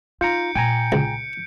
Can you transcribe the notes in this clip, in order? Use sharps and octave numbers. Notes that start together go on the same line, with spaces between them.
D#4 F4 A#5 G6 C#7 D7
A#2 G5 G#5 A#5 D7
C#2